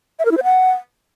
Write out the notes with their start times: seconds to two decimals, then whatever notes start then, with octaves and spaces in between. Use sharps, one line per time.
0.19 E5
0.25 A#4
0.31 E4
0.37 C5
0.44 F#5